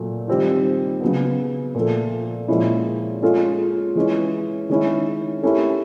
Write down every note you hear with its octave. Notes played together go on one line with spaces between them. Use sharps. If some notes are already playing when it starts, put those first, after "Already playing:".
Already playing: A#2 F#3 A3
D#3 G3 C4 F4
C#3 F#3 B3
A#2 F3 A3
A#2 F3 G#3 C#4 E4
G#3 C#4 F4 A4
E3 G#3 C#4
D#3 G#3 C#4 E4
A3 C#4 E4 G4 A#4